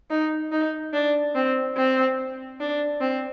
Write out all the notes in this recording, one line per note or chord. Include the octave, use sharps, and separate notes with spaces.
D#4
D#4
D4
C4
C4
D4
C4